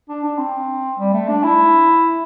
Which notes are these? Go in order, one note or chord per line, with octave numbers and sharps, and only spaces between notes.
D4
D4
C4
G3
A3
D4
E4